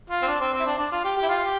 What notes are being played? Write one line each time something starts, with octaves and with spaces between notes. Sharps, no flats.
F4
C4
D4
C4
C4
E4
D4
D4
F4
G4
G4
E4
F4
G4